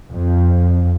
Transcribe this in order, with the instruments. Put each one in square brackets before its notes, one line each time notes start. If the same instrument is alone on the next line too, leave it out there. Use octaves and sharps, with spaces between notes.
[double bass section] F2